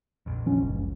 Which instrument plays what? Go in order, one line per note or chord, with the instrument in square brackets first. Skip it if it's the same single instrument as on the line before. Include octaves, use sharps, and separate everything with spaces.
[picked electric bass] A#1 F2
[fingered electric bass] F3 C#4
F#1 C#2